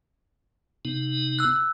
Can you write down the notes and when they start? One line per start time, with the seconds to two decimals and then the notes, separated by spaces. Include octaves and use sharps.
0.85 C3 B3 D#4
1.39 E6 F#6